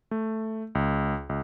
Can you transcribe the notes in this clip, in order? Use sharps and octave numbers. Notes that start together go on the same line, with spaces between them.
A3
C#2
C#2